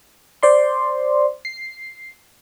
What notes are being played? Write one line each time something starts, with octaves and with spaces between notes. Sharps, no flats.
C5 D5 C6
C7